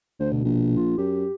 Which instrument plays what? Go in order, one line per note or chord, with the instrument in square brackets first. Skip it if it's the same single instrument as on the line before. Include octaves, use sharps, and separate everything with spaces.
[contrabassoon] D2 [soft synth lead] C5
[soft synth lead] B2
[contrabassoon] A#1
[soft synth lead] F4
[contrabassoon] F#2 [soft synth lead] G4